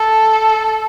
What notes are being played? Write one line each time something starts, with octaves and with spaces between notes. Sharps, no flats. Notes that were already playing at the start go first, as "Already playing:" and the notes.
Already playing: A4